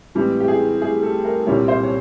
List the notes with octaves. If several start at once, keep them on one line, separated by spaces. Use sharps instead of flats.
A2 E3 G3 C4
G4
G#4
G#4
A4
A#4
C2 A#2 G3 C4 E4 C#5
C5
C#5